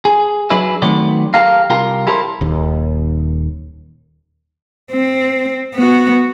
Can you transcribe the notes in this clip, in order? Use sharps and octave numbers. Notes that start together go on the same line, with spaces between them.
G#4
F#3 D4 G#4 B4 E5
D#3 F#3 A3 B3 C4 D5
G4 A4 A#4 F5
C2 F4 G4 A#4
E4 G4 A4 A#4 C5
D#1 D#2
C4
B3 F#4